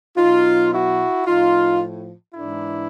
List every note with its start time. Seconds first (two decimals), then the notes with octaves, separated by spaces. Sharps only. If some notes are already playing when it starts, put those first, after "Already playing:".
0.17 B2 F#3 D#4 F4
0.72 E4 F#4
1.26 A2 F3 D#4 F4
2.35 G#2 E3 D4 E4